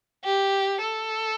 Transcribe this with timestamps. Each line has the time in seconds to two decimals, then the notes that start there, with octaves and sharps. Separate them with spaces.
0.25 G4
0.81 A4